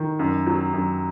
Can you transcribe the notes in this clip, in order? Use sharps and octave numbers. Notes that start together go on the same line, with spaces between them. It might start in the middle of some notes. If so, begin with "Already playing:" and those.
Already playing: D#3
F#2
F#3
F#2